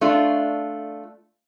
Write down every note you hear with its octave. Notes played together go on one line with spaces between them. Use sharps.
A3 D4 F4